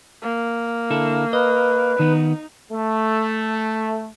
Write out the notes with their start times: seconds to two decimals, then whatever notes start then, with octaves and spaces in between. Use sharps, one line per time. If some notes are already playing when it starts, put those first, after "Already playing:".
0.22 A#3
0.91 D3 E4 A4
1.33 B4 D#5
1.99 D#3 B3 D#4
2.72 A3